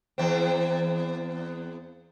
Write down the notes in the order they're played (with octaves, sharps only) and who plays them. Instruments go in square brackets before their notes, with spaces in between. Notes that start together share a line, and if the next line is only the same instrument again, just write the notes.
[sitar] E2 C4